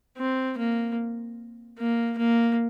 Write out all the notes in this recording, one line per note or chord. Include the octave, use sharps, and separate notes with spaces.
C4
A#3
A#3
A#3